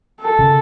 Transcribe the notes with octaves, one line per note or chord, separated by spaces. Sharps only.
A4
C#3